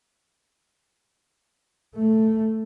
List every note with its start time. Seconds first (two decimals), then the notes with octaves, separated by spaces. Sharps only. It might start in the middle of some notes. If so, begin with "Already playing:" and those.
1.95 A3